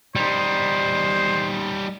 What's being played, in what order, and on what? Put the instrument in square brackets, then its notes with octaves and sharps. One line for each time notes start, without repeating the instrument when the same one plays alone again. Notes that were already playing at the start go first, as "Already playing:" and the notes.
[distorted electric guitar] G3 D#4 [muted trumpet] C5